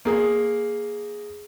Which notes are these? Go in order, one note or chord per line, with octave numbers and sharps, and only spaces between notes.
A#3 G#4